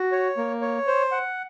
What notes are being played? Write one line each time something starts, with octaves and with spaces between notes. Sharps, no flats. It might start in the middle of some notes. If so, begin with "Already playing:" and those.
Already playing: F#4
C#5
A#3
C#5
C5
F#5